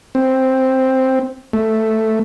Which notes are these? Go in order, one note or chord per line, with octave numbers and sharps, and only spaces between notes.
C4
A3